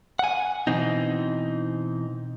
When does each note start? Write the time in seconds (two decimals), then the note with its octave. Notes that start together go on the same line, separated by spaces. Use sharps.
0.19 F#5 G#5
0.67 B2 E3 C4 D#4